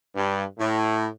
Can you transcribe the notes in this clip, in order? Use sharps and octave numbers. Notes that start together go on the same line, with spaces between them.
G2
A2